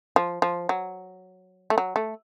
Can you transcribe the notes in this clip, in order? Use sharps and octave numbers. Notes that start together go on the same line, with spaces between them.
F3
F3
F#3
A3
F#3
A3